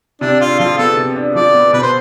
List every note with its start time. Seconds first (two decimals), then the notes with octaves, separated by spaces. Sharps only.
0.21 C3 D4
0.40 D4 F4
0.60 F3 F4
0.78 B3 A4
0.97 C3
1.16 D4
1.35 F3 D5
1.54 B3
1.73 B2 B4
1.82 C5